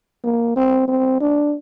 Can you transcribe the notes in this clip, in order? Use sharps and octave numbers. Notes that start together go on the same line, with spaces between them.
A#3
C4
C4
D4